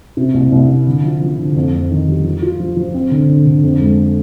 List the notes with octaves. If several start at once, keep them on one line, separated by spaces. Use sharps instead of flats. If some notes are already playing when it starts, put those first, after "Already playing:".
C3
C2
C2
C3
D3
F3
F3
D3
F2
F2
D#3
G3
F3
F4
F3
F3
C4
D3
D3
D3
F2
G#3